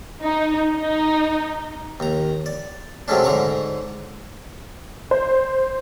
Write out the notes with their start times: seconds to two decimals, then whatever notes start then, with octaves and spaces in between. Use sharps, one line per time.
0.21 D#4
0.76 D#4
2.00 D#2 A#5
2.46 D5
3.08 C3 F#3 G#3 A3 C#4 D4
3.24 G#2 D3 A#5 C#6 D6
5.11 C5